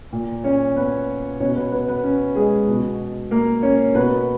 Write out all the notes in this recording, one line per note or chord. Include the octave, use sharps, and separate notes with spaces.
A#2
C#4 C#5
B3 B4
B2 C#4 C#5
B3 B4
B3 B4
B3 B4
C#4
G#3 G#4
B2
A#3 A#4
C#4 C#5
B2 B3 B4